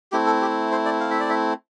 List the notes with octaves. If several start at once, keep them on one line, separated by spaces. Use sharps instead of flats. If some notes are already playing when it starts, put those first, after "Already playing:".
A3 C4 E4 G4
A4
G4
C5
D5
F5
E5
D5
E5